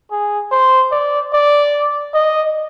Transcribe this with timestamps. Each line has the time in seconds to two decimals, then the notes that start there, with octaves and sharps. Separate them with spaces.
0.11 G#4
0.52 C5
0.92 D5
1.33 D5
2.14 D#5